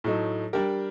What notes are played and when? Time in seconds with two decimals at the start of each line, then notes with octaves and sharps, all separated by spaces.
0.04 A2 F#3 A3 D#4
0.53 G3 D4 G4 A#4